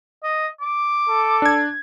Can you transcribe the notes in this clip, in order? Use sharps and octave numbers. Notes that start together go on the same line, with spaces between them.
D#5
D6
A4
D4 G#6